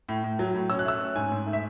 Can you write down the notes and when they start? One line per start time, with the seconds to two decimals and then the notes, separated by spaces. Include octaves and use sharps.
0.09 A2
0.24 A2
0.39 F#3
0.54 A2
0.70 C#4 E6
0.79 F#6
0.85 A3 E6
1.01 C#4
1.15 G#2 G#5
1.32 G#2
1.46 A3
1.53 E5